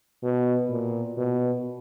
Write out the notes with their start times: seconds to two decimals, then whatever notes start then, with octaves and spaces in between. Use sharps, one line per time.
0.23 B2
0.70 A#2
1.17 B2